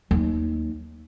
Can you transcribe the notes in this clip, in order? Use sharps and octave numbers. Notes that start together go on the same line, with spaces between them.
D#2 F#3